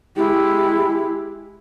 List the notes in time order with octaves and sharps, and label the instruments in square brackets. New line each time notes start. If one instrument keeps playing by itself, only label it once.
[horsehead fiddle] G#3 G4 [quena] E4